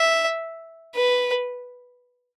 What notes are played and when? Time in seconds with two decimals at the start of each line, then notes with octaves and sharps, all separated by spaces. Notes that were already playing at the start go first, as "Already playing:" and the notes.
Already playing: E5
0.95 B4